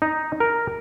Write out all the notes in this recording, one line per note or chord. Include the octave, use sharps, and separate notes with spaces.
D#4
A#4